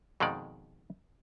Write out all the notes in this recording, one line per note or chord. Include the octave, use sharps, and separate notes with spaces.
F2 B2 D#3 G#3 D5